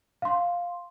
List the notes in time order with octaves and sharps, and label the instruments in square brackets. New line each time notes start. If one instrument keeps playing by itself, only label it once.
[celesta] F5 C6